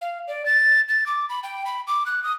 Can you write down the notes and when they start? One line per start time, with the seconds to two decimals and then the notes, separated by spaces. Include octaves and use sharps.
0.02 F5
0.28 D5
0.46 A6
0.89 A6
1.06 D6
1.29 B5
1.43 G5
1.66 B5
1.87 D6
2.06 F#6
2.24 D#6